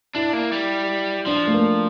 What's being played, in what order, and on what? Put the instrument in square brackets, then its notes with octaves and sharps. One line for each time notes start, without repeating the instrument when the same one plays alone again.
[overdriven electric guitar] D4 [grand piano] E4
[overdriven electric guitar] A#3
G3
[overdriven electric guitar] F3 [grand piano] D4
[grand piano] A3
A#3